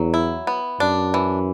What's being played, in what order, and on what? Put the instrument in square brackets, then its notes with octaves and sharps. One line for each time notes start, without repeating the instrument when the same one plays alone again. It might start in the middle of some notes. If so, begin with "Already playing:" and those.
Already playing: [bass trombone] E2 [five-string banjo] F#3
[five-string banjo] E4
B3
[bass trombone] F#2 [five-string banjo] D4
[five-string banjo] E3